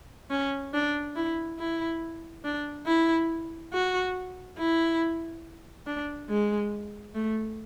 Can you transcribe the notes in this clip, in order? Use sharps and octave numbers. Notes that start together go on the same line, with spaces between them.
C#4
D4
E4
E4
D4
E4
F#4
E4
D4
G#3
A3